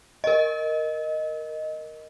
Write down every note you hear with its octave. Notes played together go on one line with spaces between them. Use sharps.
A#4 D#5